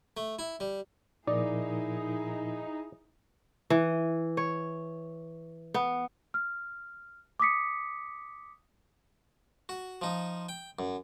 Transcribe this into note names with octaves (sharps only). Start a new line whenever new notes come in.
A3
E4
G3
A#2 F3 D#4 E4 G#4 A#4 D5
E3
C#5
B3
F6
D6 D#6 B6 C#7
F#4
F3 D#4
G5
F#2